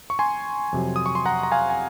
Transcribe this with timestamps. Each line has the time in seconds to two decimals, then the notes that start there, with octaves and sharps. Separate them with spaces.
0.10 C#6
0.19 G#5 C6
0.73 F2 C3 F#3
0.96 D#6
1.06 C#6
1.15 C6
1.26 F#5 A#5
1.43 A#5
1.52 F5 G#5
1.70 G#5